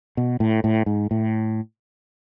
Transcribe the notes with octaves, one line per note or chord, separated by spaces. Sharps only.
B2
A2
A2
G#2
A2